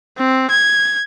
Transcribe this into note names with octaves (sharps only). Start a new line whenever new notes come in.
C4
G#6